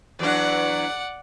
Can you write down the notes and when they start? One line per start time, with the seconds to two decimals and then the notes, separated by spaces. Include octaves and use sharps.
0.19 E2 F#3 D4 D5 F#5